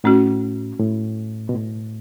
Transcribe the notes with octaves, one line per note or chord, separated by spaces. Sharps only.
A2 A3 C#4 F#4
A2
B2
A2